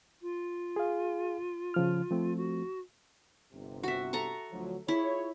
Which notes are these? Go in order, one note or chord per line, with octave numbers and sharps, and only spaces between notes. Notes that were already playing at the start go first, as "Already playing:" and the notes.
F4
G#4 F5
C#3 F3 F6
F3 A3 C4
F#4
G1 C3
F#4 E5
A4 A#5 C#6
D2 F3 F#3
E4 F4 G#4 C#5